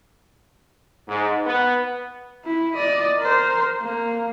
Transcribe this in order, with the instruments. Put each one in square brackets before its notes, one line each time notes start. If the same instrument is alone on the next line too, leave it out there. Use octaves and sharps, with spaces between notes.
[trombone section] G#2
B3
[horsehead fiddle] E4
D5 D#5
A#4 C5
A#3